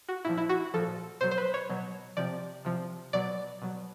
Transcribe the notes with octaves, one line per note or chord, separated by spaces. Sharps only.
F#4
A#2 F3 E4
E4
F#4
A#2 F3 A4
B2 F#3 C5
C5
B4
C#5
B2 F#3
C3 F3 D5
C3 F3
B2 F#3 D5
B2 F#3